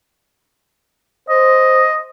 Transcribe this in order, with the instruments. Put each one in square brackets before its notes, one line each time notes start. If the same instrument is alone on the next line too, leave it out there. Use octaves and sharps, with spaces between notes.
[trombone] C5 [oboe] D#5